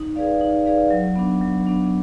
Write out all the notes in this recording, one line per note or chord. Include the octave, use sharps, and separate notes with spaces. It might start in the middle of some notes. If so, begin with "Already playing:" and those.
Already playing: D#4
G#4 B4 D5 F5
D#4
G#4 B4 D5 F5
F#3
B3 D4
F#3
B3 D4